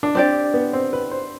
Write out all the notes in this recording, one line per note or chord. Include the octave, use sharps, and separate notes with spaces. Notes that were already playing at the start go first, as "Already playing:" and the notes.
D4
C4 D4 G4 D5
B3
C4
B4
C5